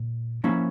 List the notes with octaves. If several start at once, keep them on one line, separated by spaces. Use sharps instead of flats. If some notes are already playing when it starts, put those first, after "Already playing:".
Already playing: A#2
F3 A#3 C#4 E4